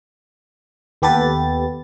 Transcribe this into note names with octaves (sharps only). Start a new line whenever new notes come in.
D#2 B3 G4 A4 B4 A6